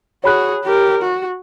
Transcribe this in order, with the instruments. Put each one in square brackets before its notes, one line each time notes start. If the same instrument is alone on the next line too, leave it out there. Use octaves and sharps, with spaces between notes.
[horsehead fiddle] F#4 G#4 [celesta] C#5 B5 F#6
[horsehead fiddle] G4 A#4
F#4